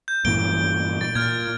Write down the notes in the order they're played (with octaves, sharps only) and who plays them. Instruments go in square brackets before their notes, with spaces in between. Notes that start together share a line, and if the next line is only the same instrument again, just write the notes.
[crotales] G6
[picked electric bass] G2 A#2 E3 [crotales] D7 G7
[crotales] A6 D7
[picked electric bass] A#2 [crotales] F6 G#6